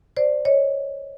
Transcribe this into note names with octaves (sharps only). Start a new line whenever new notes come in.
C5 D5
C#5 D#5